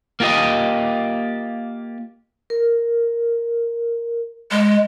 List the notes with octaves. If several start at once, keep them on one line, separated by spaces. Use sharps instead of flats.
A#3 F4 G4 D#5
A#4
G#3